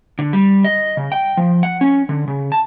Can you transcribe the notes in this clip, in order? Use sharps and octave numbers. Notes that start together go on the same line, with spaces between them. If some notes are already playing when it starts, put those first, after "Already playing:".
D3
G3
D#5
C#3
G5
F3
F#5
C#4
D3
C#3
A5